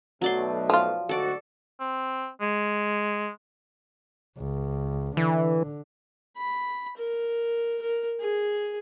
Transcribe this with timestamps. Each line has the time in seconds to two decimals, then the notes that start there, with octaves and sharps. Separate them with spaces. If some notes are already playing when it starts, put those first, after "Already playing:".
0.21 B1 B2 F#3 A3 D5 C6
0.70 F3 F4
1.09 D2 G#2 F#4 A4 D5
1.80 C4
2.41 G#3
4.37 C#2
5.17 D3 E3
6.37 B5
6.97 A#4
7.82 A#4
8.20 G#4